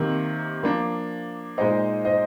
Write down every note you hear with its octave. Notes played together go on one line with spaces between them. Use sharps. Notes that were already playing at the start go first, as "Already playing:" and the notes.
Already playing: C3 D#3 A#3
F3 A#3 D4
A#2 G#3 D#4 C5 D#5
C5 D#5